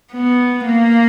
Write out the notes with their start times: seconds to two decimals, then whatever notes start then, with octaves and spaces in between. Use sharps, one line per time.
0.13 B3
0.66 A#3